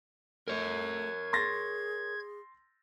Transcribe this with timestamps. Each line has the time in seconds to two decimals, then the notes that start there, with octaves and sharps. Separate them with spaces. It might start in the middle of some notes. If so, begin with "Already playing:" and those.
0.48 A3 A#4 C#5 G#6
1.33 G#4 C6 A6 A#6